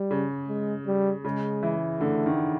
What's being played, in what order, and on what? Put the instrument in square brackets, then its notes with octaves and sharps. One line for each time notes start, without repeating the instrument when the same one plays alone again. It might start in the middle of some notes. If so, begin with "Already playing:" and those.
Already playing: [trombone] G3
[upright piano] C#3
[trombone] G#3
G3
[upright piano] C#3 [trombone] G#3
[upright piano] E3
[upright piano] D3 [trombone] A3
[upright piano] D#3